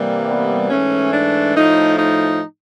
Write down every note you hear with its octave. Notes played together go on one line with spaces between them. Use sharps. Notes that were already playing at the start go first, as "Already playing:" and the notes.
Already playing: C3 E3 G3 A#3
B3
G#2 E3 A3 C#4
D4
A2 F3 A3 D#4
D#4